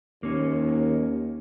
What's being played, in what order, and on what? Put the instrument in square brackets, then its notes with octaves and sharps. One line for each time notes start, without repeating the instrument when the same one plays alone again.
[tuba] D#2 [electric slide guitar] A#3 C#4